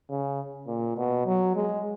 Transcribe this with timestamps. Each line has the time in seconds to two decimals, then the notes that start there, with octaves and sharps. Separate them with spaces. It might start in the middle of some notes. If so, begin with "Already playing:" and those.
0.10 C#3
0.67 A#2
0.97 B2
1.26 F#3
1.55 G#3